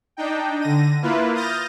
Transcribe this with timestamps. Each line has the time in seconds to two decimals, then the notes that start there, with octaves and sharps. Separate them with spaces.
0.17 D4 D#4 G5
0.60 D3 A#6 D#7
1.02 A#3 E4 F4 B4
1.35 D#6 F6 G6 A6 A#6